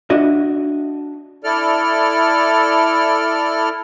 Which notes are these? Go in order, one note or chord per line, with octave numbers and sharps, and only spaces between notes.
D4 F#4 D#5 E5
E4 A4 D5 F6